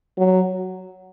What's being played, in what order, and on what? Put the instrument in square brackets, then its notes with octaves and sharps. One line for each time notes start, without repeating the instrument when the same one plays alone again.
[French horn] F#3